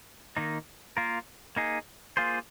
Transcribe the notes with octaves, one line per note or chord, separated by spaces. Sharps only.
D#3 A#3 D#4
A#3 F4 A#4
A#3 D#4 G#4
A#3 F4 G#4 C5